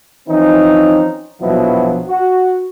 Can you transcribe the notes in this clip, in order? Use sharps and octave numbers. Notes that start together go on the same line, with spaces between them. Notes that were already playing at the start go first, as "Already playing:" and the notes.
E3 F3 C4 C#4 D#4
A#1 B2 F3 F#3 E4
F#4